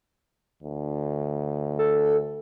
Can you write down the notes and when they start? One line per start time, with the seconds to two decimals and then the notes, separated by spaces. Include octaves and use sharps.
0.63 D2
1.79 A4